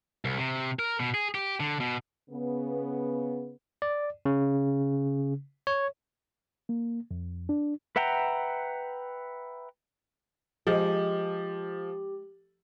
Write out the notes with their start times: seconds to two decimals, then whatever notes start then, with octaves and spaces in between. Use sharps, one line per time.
0.25 C2
0.39 C3
0.79 A#4
1.00 B2
1.14 G#4
1.35 G4
1.60 D3
1.80 B2
2.30 C#3 B3
3.82 D5
4.25 C#3
5.67 C#5
6.69 A#3
7.11 F2
7.49 D4
7.96 B4 E5 F#5 G5 A#5
10.67 F3 G#3 G4